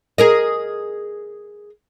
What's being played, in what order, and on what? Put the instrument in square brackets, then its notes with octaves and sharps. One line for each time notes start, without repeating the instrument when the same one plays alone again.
[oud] G#4 A#4 D#5